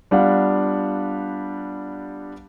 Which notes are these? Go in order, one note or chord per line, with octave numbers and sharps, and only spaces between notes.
G3 B3 D4 F4 F5 F#5